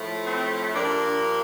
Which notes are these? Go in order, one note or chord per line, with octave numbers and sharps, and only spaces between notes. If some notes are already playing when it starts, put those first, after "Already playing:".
Already playing: A2 F3 A3
C4
G2 F3 A#3 D4